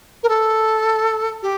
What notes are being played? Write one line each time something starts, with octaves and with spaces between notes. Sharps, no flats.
A#4
A4
G4